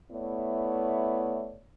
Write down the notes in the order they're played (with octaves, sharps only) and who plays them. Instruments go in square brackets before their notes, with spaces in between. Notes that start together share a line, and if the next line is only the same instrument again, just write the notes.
[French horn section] A3 B3 E4 C#5 D5